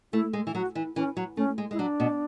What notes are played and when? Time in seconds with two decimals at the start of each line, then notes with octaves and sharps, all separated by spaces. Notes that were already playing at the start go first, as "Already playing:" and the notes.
0.13 A3 E4
0.33 G#3
0.47 E3
0.54 F#3 F#4
0.75 E3
0.96 E3 C#4
1.17 F#3
1.37 A3 C#4
1.58 G#3
1.71 G#3 E4
1.79 F#3 D4
2.00 B2